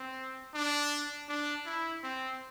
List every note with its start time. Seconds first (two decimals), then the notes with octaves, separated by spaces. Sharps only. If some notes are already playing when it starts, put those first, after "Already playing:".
Already playing: C4
0.54 D4
1.28 D4
1.66 E4
2.03 C4